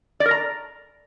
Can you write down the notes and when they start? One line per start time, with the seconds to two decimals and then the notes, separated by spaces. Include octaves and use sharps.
0.20 D5
0.26 A#4
0.31 A#5